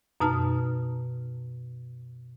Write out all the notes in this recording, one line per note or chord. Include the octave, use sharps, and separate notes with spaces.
F#2 B2 D#4 A5 F6